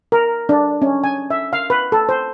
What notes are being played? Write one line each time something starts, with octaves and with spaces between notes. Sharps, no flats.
A#4
D4
C#4
G#5
E5
F5
B4
A4
C5